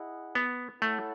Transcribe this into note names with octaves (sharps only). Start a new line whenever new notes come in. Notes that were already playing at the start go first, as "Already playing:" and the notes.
Already playing: E4 G#4 D#5 F#5
B3
A3 E4 A4 C#5 F#5